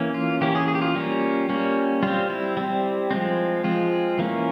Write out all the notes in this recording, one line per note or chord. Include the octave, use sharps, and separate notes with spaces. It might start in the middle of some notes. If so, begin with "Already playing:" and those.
Already playing: E3 A#3 C#4
F4
E3 A#3 C#4 G4
G#4
G#4
G4
F4
G3 A#3 C#4
G3 A#3 C#4
G3 C4 F4
E4
G3 C4
F3 G#3 C4
F3 G#3 C4 F4
E3 A#3 C#4